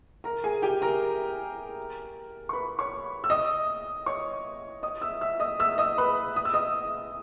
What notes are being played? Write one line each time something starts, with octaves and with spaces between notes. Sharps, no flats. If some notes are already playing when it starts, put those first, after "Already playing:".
A#4 A#5
G#4 G#5
G4 G5
A#4 A#5
C#6
B4 B5
C#5 C#6
E6
D#5 D#6
C#5 C#6
D#5 D#6
E5 E6
E5 E6
D#5 D#6
E5 E6
D#5 D#6
B4 B5
D#6
E6
D#5 D#6